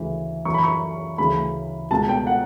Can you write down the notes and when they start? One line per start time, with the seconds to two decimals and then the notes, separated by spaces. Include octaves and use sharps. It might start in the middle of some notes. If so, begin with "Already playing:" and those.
Already playing: D2 C#3 E3
0.45 F#2 E3 C#6
0.54 B5
0.63 C#6
1.18 D2 C#3 E3 B5
1.91 C#2 B2 A5
2.09 G5
2.27 F#5